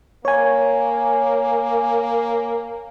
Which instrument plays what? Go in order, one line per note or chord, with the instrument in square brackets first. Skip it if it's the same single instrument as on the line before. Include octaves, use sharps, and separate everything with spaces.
[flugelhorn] A#3 [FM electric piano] C#5 G#5